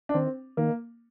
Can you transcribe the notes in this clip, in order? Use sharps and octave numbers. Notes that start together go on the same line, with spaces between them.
D4
D#3 C4
D#3 A#3